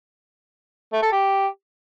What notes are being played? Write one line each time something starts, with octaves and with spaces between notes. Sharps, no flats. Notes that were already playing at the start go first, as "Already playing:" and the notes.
A3
A4
G4